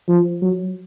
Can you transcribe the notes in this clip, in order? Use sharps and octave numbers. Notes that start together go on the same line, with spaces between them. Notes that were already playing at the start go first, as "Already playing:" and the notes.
F3
F#3